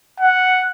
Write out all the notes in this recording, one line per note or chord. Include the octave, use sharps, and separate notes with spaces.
F#5